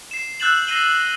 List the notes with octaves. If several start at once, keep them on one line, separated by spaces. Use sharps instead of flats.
C7 E7
E6 F#6 G6 A6 E7 F#7
A#6 C7 D#7 G7